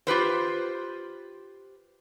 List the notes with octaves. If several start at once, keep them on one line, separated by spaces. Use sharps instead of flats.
F4 G4 B4 C5